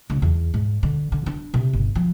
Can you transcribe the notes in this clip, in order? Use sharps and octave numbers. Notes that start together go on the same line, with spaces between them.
C#2
E2
G#2
D3
D3
D4
C3
G1
F3